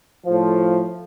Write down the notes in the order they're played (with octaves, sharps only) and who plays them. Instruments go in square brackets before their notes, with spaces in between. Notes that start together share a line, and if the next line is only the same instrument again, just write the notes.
[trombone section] A2 F3